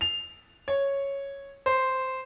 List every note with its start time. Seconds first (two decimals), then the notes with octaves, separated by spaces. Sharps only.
0.01 F7
0.68 C#5
1.66 C5